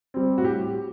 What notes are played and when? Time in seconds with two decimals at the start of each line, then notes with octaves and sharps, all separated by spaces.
0.14 G3 C4
0.38 A2 F#4
0.45 G4